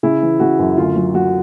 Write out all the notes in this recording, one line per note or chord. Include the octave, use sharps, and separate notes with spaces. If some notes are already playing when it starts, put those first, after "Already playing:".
C#3 E4
E3
C#3 F#4
F#2
D2 F4
F#3
F#3 F#4